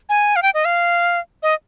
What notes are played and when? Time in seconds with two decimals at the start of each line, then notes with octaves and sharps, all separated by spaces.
0.09 G#5
0.36 F5
0.42 G5
0.54 D#5
0.65 F5
1.43 D#5